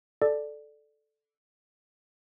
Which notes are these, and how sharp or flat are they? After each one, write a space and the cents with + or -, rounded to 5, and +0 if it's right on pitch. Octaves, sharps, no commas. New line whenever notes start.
A4 -5 D5 +10